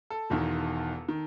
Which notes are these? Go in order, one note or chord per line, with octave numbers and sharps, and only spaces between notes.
A4
E1 E2 D#3
D#3